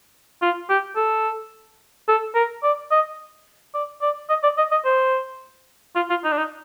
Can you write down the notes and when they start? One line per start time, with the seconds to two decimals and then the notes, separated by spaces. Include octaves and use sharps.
0.42 F4
0.69 G4
0.96 A4
2.08 A4
2.35 A#4
2.63 D5
2.91 D#5
3.74 D5
4.02 D5
4.29 D#5
4.43 D5
4.58 D#5
4.71 D#5
4.85 C5
5.96 F4
6.10 F4
6.24 D#4
6.32 D4
6.38 D#4